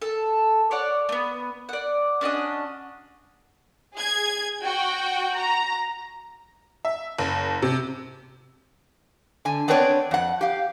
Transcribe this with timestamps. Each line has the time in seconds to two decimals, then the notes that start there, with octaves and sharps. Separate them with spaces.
0.02 A4
0.71 C#5 D5 F#5
1.09 A3 B3
1.69 D5 F#5
2.21 C#4 D4 F#4 D#5
3.95 G#4 G#6
4.64 F#4 G5
5.37 A#5
6.85 E5
7.18 F#1
7.62 C3
9.45 D3 G#5
9.68 B3 C4 D4 B4 C#5 D5
10.11 F2 F#5
10.41 G4 F5